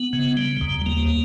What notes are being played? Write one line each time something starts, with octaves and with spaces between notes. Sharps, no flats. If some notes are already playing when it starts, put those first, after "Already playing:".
Already playing: B3
C#3
G3
D#2
A#3